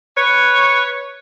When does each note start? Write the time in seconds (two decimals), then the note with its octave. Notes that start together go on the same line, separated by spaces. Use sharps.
0.16 B4 C#5